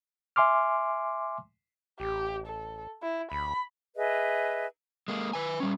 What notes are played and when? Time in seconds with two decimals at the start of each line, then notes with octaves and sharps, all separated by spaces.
0.36 E5 G#5 C6 D6 F6
2.00 A1 G4
2.47 A4
3.03 E4
3.32 D2 B5
3.96 G#4 B4 D#5 E5
5.08 G#3 A#3
5.33 B4 G#5
5.60 G3 C#4